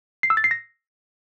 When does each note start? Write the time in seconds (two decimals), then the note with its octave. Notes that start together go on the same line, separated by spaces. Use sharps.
0.23 C7
0.30 E6
0.37 A6
0.44 C7
0.51 A#6